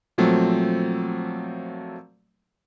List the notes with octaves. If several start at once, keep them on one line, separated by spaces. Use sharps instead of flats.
A#2 F3 F#3 A3 C4